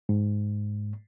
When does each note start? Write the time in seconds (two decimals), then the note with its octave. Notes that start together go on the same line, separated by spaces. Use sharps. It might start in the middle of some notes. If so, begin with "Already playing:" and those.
0.09 G#2